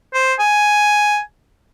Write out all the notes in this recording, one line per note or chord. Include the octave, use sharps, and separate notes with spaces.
C5
G#5